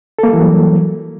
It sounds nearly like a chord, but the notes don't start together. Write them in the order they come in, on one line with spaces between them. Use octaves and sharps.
A4 A#3 G3 E3 F#3